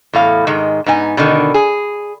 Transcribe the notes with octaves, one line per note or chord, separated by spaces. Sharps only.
E2 A2 F5
G#2 D#3 G#3
G#2 B3 D#4 G#5
B2 D3 D#3
G#4